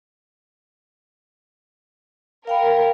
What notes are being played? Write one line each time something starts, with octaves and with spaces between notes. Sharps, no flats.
A#4 F5 G5 B5